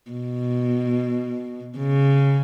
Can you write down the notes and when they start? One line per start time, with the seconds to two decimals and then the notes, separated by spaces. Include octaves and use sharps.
0.11 B2
1.78 C#3